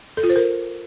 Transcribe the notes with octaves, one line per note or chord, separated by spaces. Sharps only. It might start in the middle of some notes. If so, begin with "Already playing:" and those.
A4
F4
C5
A#4